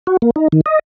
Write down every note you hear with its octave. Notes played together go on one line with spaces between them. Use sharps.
F#4
A#3
D#4
D#3
D#5